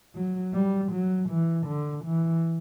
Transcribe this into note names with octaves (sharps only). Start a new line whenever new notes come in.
F#3
G3
F#3
E3
D3
E3